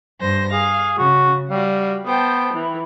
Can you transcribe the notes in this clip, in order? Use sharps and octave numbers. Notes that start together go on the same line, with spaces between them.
G2 C5 A#6
G#4 F5
C#3 F#4
G3 F#4 F5
B3 C5 G5 A5
E3